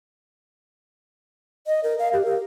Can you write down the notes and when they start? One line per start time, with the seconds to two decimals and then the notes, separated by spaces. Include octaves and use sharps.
1.67 D#5
1.84 A#4
1.99 F5
2.13 G4
2.25 A#4